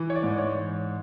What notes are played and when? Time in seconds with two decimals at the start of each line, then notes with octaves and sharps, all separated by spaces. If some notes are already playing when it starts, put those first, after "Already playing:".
Already playing: E3
0.10 C#5
0.15 D5
0.23 G#2
0.38 C#5